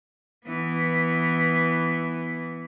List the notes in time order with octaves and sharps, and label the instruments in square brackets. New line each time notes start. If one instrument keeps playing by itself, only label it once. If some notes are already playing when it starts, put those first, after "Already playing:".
[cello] E3 B3